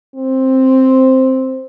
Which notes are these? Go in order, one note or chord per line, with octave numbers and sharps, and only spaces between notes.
C4